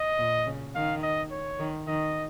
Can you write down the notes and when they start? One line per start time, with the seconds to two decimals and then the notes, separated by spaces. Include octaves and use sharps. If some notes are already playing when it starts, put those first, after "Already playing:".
Already playing: D#5
0.18 A#2
0.46 C#3
0.75 D#3 F5
1.03 D#5
1.31 C#5
1.59 D#3
1.87 D#3 D#5